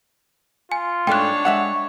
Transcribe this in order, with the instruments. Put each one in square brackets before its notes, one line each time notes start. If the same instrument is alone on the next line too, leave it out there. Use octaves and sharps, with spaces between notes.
[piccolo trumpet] F4 [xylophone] G#5
[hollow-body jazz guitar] G#2 A3 [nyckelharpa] D4 C#5 [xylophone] G5 F#6
[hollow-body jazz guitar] G#3 E5 F#5 [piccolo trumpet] C#6